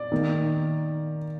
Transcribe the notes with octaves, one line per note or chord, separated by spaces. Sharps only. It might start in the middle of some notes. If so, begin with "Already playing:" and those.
Already playing: D5
D#3 A#3